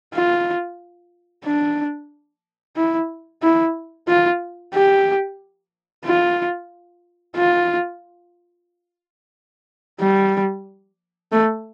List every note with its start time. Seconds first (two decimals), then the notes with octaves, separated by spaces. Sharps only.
0.14 F4
1.44 D4
2.76 E4
3.43 E4
4.08 F4
4.74 G4
6.05 F4
7.36 F4
10.00 G3
11.32 A3